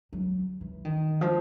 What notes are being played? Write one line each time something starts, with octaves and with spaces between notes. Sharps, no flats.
F#3
E3
D#3
F3